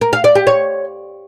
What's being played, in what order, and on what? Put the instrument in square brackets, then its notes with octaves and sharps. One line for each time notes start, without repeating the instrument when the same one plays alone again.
[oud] A#4
F5
D5
G4
C#5